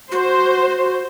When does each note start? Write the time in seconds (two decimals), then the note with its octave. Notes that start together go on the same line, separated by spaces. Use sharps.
0.12 F#4 C5